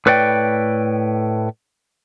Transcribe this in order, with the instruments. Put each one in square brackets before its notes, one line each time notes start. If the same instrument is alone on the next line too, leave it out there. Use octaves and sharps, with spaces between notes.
[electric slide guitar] A2 B4 C#5 D5 G5